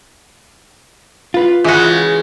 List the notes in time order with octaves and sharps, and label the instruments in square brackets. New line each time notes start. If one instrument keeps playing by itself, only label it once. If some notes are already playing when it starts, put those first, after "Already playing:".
[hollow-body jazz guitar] F4 B4
[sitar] C#3 G#3 [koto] E3 F#4